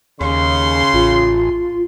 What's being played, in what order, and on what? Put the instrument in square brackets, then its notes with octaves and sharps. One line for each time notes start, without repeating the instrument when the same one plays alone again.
[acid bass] D#2 [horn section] C#3 C6
[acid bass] A1 [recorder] F4